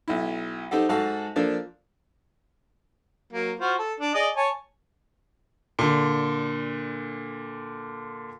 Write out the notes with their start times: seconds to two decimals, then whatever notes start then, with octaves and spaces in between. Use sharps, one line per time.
0.08 B1 E4
0.71 C4 D#4 G4 A4 F#5
0.89 G#2 F#4 A4 F5 A5
1.36 F3 A#3 D4 A4
3.33 F#3 A#3
3.60 F4 F#4 C5
3.79 A4
4.00 D4
4.14 G#4 D5 D#5
4.36 C#5 G#5 A5
5.79 A#2 D3